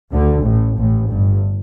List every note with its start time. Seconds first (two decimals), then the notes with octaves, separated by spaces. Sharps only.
0.13 D2 D3
0.46 A1 A2
0.79 A1 A2
1.11 G1 G2